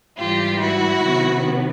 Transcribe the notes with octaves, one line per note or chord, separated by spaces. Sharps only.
G#2 E3 G3 F4 G4
E4 F#4
C3 D#3 F#3 B3